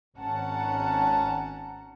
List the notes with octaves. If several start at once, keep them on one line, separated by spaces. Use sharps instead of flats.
G#1 C#4 F#5 A5 A#5